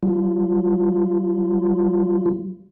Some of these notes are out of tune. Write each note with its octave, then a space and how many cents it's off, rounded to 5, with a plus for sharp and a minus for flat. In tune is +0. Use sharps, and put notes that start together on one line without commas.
G3 -45 F4 -30